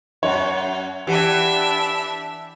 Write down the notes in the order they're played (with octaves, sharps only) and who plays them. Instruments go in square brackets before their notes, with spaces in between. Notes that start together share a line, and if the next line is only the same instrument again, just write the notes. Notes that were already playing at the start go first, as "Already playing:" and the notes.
[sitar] F#2 [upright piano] C#5 F#5
[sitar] E3 [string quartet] D4 E5 [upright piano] G4 F#5